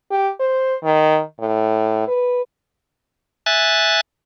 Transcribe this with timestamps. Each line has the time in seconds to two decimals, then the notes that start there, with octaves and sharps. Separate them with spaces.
0.11 G4
0.40 C5
0.83 D#3
1.40 A2
2.08 B4
3.46 E5 G#5 F#6 A6